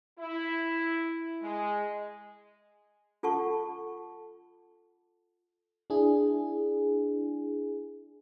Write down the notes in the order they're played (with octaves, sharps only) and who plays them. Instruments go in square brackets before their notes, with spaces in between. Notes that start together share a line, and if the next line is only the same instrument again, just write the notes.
[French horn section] E4
G#3
[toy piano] F4 A4 F#5 A5 C#6
[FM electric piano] D4 E4 G#4